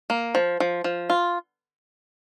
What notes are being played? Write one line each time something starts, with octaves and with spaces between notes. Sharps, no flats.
A#3
F3
F3
F3
F4